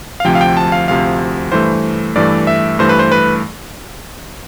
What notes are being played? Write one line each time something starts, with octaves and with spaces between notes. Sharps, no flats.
F5
D2 C3 F3 G5
F5
G5
A5
F5
D2 C3 F3 F5
G2 E3 A3 C5
G2 E3 A3 D5
E5
G2 E3 A3 C5
B4
C5
B4